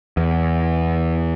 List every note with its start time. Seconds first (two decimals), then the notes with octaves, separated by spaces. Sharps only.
0.17 E2